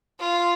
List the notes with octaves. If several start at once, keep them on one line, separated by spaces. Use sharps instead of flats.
F4